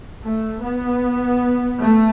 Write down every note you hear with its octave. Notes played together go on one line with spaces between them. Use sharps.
A3
B3
A3